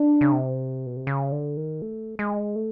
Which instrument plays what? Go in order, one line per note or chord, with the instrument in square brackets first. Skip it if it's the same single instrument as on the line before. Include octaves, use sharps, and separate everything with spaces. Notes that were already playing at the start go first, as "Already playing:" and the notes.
Already playing: [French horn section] D4
[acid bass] C#3
C3
B2
C3
C#3
D3
D#3
A3
G#3
A3